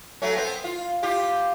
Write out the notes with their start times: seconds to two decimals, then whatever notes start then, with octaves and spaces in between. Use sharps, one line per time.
0.22 F#3 A3 C#4
0.36 B3 C4
0.64 F4
1.03 F4 G4